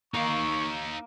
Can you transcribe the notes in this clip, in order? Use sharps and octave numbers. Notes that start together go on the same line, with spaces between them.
A#3 D#4 F5 C#6